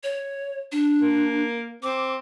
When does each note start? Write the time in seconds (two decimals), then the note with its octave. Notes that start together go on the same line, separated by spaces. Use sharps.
0.03 C#5
0.72 D4
1.00 A#3
1.83 C4 D6